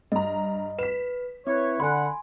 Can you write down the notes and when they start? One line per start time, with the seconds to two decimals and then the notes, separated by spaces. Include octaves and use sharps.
0.12 G2 D#5 A#5
0.79 B4 B6 E7
1.47 C4 E4 B4 C#5
1.80 D3 F#5 G#5 B5 C6